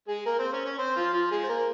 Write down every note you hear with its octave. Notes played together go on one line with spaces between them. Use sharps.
G#3 G#4
A#3 A#4
C4 C5
C#4 C#5
C#4 C#5
C4 C5
F3 F4
F3 F4
G#3 G#4
C5
A#3 A#4